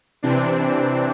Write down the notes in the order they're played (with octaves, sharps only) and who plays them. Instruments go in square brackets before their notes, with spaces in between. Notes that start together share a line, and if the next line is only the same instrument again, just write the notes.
[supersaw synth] C3 E3 C4 D4